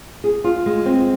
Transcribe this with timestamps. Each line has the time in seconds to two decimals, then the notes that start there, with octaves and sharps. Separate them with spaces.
0.24 G#4
0.44 F4
0.66 G#3
0.86 C4